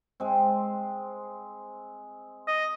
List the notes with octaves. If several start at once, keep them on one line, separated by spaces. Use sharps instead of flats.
G#3 C4
D#5